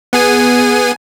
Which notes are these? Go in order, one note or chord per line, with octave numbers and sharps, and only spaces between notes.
B3 G#4 G#5